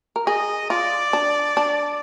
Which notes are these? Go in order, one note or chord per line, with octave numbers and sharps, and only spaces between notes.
A#4
G#4 D#5
F4 D5
D4
D4